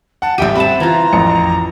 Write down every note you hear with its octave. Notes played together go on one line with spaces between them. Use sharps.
F#5 A5
A1 G3 G4 E5 G5 D#7
C4 F#5 A5 B5
E3 F4 A#5
A1 F2 C#7